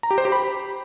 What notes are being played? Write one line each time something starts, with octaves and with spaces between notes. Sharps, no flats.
A#5
G4
C5
G4
B5